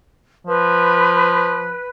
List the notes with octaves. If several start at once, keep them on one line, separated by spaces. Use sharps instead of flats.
F3 B4